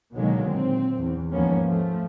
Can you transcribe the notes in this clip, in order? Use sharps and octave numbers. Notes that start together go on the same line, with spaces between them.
B2 D3 D#3 F#3 G#3 A#3
A#2 C4
E2
D#2 G#2 F3 A#3 B3 C#4
F3 A3